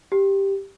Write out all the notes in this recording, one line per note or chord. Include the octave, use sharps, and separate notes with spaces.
G4